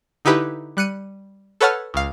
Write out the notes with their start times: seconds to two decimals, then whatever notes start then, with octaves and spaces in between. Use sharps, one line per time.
0.25 D3 D#4 E4 G4 B4
0.77 G3 F#6 C#7 D#7
1.61 A4 B4 C#5 F#5 A5 F6
1.94 C#2 F5